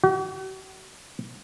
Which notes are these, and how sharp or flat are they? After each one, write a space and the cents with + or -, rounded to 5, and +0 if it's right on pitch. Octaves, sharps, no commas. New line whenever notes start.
F#4 +45